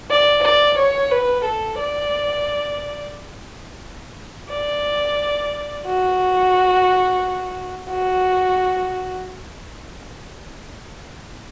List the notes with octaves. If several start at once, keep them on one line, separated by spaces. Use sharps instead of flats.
D5
D5
C#5
B4
A4
D5
D5
F#4
F#4